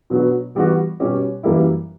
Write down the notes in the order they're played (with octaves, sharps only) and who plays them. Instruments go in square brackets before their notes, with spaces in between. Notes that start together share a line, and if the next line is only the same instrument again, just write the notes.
[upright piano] B2 F#3 B3 D4 F#4
E3 G3 B3 F#4
B2 G3 C#4 G4
F#2 E3 G3 A#3 E4